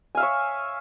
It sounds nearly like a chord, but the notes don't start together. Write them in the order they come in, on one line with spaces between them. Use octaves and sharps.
G#5 F5 E5 C#5